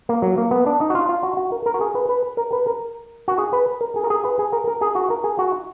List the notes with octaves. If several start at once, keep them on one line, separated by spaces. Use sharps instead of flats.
A#3
F#3
A#3
B3
D4
D#4
F#4
F4
F4
F#4
F#4
A#4
A#4
F#4
G#4
B4
B4
A#4
B4
A#4
F#4
G#4
B4
A#4
G#4
A#4
G#4
B4
G#4
A#4
A#4
G#4
F#4
A#4
G#4
F#4